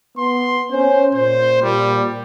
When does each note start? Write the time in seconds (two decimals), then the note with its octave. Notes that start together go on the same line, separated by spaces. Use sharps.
0.18 B3 C6
0.72 C#4 C5
1.14 A#2 C5
1.62 A#2 G3